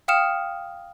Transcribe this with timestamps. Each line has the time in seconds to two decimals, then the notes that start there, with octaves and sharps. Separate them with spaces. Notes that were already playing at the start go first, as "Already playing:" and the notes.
0.08 F5 G5 D#6 F6 C#7 E7